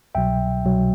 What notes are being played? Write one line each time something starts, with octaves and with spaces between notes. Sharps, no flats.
C2 B2 F#3 E5 G5
C2 B2 F#3